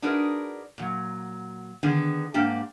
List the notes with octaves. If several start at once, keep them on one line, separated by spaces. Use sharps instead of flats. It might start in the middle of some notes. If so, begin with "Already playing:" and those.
D4 D#4 F#4 G#4 A#4 B4
A#2 F#3
D3 D#3 B3 D#4 G#4
G#2 A#3 D4 G4